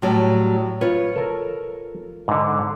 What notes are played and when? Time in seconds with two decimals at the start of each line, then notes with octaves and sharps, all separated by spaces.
0.02 A2 F#3 G3
0.81 F4 B4 C#5
1.16 A4 A#4
2.28 G#2 D3